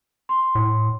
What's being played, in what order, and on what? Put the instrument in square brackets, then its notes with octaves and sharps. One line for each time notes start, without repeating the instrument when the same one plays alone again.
[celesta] C6
[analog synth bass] A2